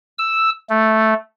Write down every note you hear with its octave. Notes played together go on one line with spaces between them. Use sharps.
E6
A3